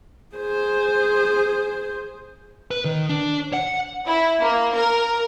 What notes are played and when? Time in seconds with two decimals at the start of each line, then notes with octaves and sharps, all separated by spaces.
0.36 G#4 C5
2.71 B4
2.85 D#3
3.09 D4
3.53 F#5
4.07 E4
4.42 A#3
4.75 A#4